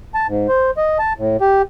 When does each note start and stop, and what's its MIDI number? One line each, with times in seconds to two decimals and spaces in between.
0.14 0.27 81
0.28 0.47 44
0.48 0.71 72
0.77 0.98 75
0.99 1.13 81
1.18 1.37 45
1.41 1.62 67